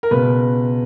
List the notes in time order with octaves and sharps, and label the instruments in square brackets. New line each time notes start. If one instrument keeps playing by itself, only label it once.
[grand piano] A#4
C#2 B2 B4